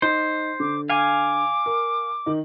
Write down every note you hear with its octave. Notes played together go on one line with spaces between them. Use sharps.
D#4 C5
D3 D6
F5 G#5 D6
A#4
D#3 D#4